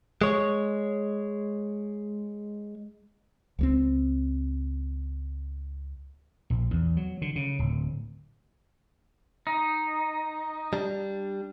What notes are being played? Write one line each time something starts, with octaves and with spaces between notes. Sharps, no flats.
G#3 C#5
C#2 G3 C4
A#1
E2
F#3
D3
C#3
D1
D#4
G3 D4